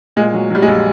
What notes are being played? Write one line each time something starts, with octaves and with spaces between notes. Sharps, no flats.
A#2 G#3
F#3
F#3 G3
G#3
A#1